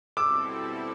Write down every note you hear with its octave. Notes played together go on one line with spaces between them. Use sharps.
B2 G3 C4 E4 A4 D6 E6